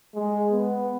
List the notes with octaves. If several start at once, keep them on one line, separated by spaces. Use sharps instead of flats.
G#3
B3